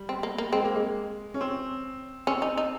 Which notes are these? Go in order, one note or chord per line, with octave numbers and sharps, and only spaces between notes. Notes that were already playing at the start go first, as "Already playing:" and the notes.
Already playing: G3
C4
A#3
A#3
G#3 C4
A#3
G#3
C#4
C4
C4 C#4
D#4
D#4